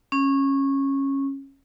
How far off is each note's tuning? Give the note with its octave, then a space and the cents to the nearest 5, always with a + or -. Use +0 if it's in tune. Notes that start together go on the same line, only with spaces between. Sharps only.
C#4 -15